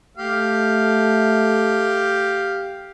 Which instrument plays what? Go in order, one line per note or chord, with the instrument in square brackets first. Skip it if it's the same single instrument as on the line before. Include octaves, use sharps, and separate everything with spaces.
[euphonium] A3 [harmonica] G4 F5